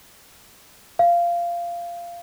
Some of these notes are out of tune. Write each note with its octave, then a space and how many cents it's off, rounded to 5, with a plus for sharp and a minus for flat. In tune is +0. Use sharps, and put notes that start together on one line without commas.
F5 -15